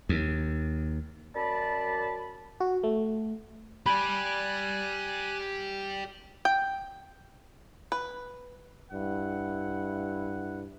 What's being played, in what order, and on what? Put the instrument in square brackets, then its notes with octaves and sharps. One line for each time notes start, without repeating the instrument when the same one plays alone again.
[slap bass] D#2
[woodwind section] F#2 D5 A5 B5
[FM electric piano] F#4
A3
[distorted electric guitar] G4 D5 [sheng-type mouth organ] G#5 F#6 [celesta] B5 F#7
[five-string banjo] G5
B4
[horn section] G2 E4 F#5